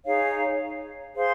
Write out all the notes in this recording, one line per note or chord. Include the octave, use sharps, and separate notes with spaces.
D#4 G#4 C#5 F5
G#4 C5 F5 C6